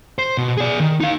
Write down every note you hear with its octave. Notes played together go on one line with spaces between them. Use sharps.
C5
B2
G#4 D5
D#3
D#4 F5